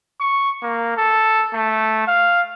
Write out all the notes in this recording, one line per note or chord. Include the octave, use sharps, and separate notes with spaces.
C#6
A#3
A4
A3
F5